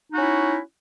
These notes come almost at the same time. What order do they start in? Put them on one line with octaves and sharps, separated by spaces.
D#4 F#4 C#4 E4